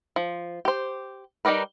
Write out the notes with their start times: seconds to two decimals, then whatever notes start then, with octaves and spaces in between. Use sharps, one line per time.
0.16 F3
0.65 G4 C5
1.45 G3 D#4 G4 A#4 B4